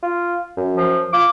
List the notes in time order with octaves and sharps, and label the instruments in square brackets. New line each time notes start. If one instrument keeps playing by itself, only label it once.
[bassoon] F4
F#2
[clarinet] F3
[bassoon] F4 [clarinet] D6